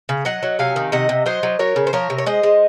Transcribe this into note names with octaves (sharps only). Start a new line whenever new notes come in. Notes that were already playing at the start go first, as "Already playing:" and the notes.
C#3
F#3 D#5 F#5
F#3
C3 F5 G#5
D#3
C3 D#5 F#5
C3
F#3 C5 D#5
F#3
F#3 A#4 C#5
C#3
C5
F3 A#4 C#5
C3
C#5
G#3 C5 D#5
G#3